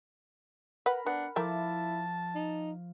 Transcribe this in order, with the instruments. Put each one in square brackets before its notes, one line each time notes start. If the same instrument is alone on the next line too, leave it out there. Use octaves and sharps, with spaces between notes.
[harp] A#4 B5 [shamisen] B4 F#5
[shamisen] B3 [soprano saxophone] D4 [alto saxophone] F#5
[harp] F3 D6 [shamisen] A3 A#4 E5 [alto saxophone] E4 [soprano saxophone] A5
[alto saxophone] D#4